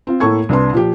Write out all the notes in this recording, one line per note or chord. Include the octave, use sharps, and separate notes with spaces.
C4 F4
A2 A#3 A4 C#6 G#6
C2 D4 B4 C6
A#2 F3 G4